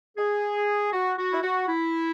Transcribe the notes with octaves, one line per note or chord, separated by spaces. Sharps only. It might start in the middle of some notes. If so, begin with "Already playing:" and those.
G#4
F#4
F#4
E4
F#4
E4